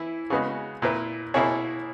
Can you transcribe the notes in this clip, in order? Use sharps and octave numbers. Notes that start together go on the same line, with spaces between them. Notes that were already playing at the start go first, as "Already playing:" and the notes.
Already playing: E3 E4
C#3 G#3 B3 F#4
A#2 A#3 E4 B4
B2 A#3 E4 G#4 C#5